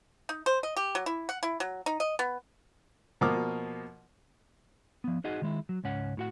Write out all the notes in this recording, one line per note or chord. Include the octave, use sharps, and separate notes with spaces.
D#4
C5
D#5
G4
F#3
E4
F#5
E4
F#3
D#4
D#5
B3
B2 F3 A#3 D6 D#6 F6
F3 B3
D#4 F#4 G#4 D#5 F#5
D#3 G#3 E4
F#3
C#2 G#2 C#4 F#5
A2 F#4 F#5